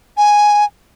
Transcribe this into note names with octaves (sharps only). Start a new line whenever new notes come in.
G#5